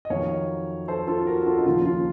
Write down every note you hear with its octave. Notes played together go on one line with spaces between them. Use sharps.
D#5
F2 D#3 F#3 C#5 F5
A4 C5
F4 A4
F#4 A#4
F#4
F4 A4
D#4
D#2 C#3 F3 F4
F4